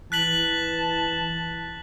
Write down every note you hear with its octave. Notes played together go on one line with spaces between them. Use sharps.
E3 A5 F#6 B6 F#7